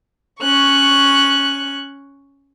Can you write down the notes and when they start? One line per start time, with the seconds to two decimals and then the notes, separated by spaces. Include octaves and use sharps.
0.42 C#4 C#6 F#6